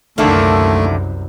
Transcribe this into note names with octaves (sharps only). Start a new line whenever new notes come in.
C2 F#2 D3 D#3 A3 A#3 E4 A4